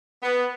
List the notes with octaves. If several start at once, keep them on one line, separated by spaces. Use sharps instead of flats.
B3